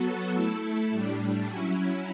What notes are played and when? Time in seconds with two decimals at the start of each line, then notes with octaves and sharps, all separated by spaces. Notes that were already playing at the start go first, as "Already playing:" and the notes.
Already playing: F#3 B3 F#4 A4
0.34 A3 E4 A4
0.90 A2 G3 D4
1.46 F#3 C#4 E4